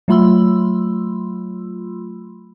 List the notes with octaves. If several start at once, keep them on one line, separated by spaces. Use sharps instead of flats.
F#3 A3 F4 B5 C6 E6